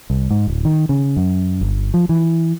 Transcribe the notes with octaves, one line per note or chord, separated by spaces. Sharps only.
C2
G#2
D1
D#3
C#3
F#2
G1
F3
E3